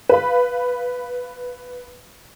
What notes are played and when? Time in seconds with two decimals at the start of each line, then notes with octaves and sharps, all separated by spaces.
0.09 B4 F5 B5